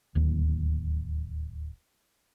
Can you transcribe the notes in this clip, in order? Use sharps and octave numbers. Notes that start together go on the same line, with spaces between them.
D1 D#2